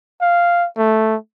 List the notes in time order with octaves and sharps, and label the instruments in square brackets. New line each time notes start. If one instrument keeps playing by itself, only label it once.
[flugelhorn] F5
A3